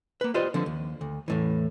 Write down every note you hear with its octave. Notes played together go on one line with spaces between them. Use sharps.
A#3 B4
F4 G4 B4 C5 D5 D#5
D3 F3 C4
D#2
D2
E2 A2 E3